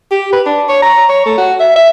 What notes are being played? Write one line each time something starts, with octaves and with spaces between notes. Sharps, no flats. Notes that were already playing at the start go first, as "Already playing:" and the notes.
G4
B4
D4
C#5
A#5
C#5
A3
F#4
E5
E5